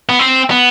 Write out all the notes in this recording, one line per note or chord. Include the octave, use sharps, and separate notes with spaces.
B3
C4
B3